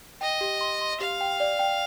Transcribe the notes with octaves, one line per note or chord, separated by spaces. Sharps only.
D#5 G5
G4
C6
C6
G4 F5
G5
D5
G5